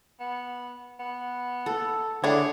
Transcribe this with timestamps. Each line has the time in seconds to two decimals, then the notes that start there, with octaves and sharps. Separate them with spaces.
0.20 B3
1.00 B3
1.66 A4
2.24 D3 D4 E4 G#4 C#5